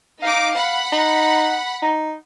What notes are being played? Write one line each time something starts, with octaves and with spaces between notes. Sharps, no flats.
D#4 F5 D6
F#5 B5
D#4
D#4